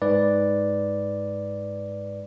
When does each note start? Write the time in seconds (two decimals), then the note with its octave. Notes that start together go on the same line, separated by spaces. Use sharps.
0.02 G#2 B4 D5